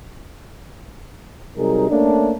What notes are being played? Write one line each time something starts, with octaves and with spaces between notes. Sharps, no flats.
C3 F#3 G3 D#4 G#4 A#4
A3 A#3 C#4 D4